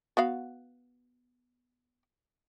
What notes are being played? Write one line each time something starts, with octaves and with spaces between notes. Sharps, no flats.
B3 F#4 F5